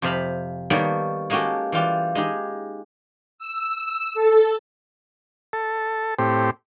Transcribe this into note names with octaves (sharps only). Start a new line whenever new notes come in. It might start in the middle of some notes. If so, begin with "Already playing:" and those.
F2 C3 C5 E5 F5 B5
D#3 G3 A#3 B3 A4 C#5
G#3 A#3 C#4 F#4 G4 A4
E3 G3 F4 G4
G#3 D#4 G4
E6
A4
A4
A2 C4 G4